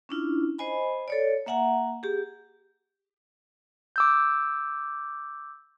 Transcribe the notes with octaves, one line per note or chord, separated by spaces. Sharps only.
C#4 D4 E4 F4
C5 D#5 G#5 B5
A4 C#5 D5
A#3 E5 F#5 G#5 A#5
G4 G#4
D6 E6 G6